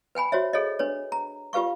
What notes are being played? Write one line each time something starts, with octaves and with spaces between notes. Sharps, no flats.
B4 G5 G#5 B5
F#4 C5 C#5 E5
G#4 A4 C#5 D#5
D4 B4 C#5
A#5
F4 G4 B4 F5 C#6